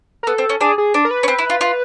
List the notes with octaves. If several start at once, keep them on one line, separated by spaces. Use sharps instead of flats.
A#4
B3 A4
C4
C#4
D4 G#4
G#4
D4
A#4
B4
C#4
C4
E4
F4
F4